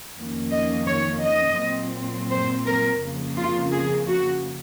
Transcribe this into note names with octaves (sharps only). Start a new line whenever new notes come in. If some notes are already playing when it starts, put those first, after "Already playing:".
F2 D#3 A#3 C#4
D#5
C#5
D#5
A#2 F#3 C4
C5
A#4
F2 C#3 F3 A#3
F4
G#4
F#4